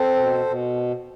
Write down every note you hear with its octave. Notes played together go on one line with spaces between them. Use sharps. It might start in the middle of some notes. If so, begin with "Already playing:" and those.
Already playing: C4 A4 C5
B2
B2